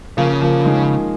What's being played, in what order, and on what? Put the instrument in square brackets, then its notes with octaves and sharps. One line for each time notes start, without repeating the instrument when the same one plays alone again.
[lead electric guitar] C#3 [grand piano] F3 A#3
[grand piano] F3 A#3
D#3 G#3